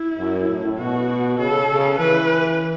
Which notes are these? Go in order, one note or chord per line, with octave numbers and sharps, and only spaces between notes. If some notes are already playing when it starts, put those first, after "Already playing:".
Already playing: E4
F#2
A2
B2 F#4
C#3 A4
C#3
E3 B4